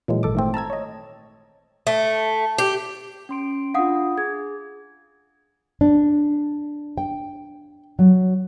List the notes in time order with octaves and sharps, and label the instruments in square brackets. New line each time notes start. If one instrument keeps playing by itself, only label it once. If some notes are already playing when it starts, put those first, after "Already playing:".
[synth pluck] A#2 E3 F#3 G#3
G#1 A4 D6
D#3 A3 C4
A5 A#5 E6 G#6
C#5 D#5
[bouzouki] A3
G4
[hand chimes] C#4 C6 D7
[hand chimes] D4 F4 [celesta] F5 F#5 D#6
[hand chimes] G#4 [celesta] G#6
[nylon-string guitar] D4
G5
F#3